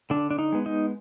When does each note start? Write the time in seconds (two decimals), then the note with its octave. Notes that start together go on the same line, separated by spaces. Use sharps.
0.10 D3 D4
0.31 D4
0.39 D#4
0.52 G#3 B3
0.66 D#4